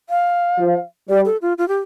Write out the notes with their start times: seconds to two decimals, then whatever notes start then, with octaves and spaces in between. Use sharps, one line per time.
0.10 F5
0.59 F3
1.09 G3 D5
1.25 A4
1.42 F4
1.58 F4
1.68 G4